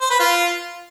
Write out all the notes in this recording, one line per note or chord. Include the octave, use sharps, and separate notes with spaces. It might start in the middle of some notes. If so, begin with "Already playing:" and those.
C5
B4
F4